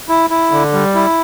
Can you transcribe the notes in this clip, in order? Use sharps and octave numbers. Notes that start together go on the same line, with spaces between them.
E4
E4
D3
G3
E4